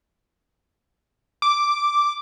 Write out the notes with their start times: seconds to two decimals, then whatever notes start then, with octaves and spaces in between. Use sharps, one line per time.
1.42 D6